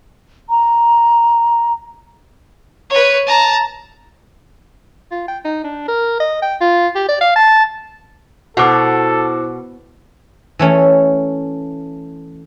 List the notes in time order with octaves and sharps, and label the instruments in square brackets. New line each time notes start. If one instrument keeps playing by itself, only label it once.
[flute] A#5
[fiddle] B4 C#5
A5 A#5
[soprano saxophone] F4
G5
D#4
D4
A#4
D#5
G5
F4
G4
D5
F5
A5
[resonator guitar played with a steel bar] B2 [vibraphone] E4 C5 [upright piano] F#4 D6 [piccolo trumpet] A4
[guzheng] E3 A3 C#4